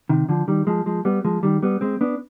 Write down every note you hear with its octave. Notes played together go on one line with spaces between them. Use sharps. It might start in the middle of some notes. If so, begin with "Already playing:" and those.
C3 D#3
D3 F3
D#3 G3
F3 G#3
F3 G#3
G3 B3
F3 G#3
D#3 G3
G3 B3
G#3 C4
B3 D4